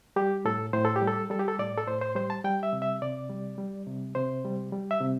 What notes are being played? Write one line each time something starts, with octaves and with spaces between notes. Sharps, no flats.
G3 G4
A2 A4
A2 C5
A4
G4
G3
A4
G3 A4
G4
A4
A2 D5
A4
A2 C5
C5
G3 C5
A5
G3 G5
E5
C3
E5
C3 D5
G3
G3
C3
C3 C5
G3
G3
E5
C3